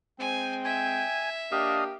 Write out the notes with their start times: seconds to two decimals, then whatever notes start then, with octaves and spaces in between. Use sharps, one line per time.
0.20 G#3 C4 G5 G#5
0.65 E5 G#5
1.52 A#3 D4 G4 D#5 F5